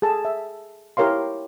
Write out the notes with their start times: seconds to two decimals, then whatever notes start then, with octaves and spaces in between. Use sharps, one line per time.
0.02 G#4 A4 A5
0.25 E5
0.97 E4 G4 A#4 C#5 F5 C6